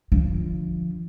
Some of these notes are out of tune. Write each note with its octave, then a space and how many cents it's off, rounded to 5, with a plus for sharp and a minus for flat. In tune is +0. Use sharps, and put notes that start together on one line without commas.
D3 +0 F3 -20